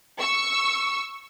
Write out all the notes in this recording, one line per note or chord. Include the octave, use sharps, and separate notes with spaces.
C#6 E6